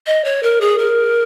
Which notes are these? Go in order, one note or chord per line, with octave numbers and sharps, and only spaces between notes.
D#5
C#5
A#4
G#4
A#4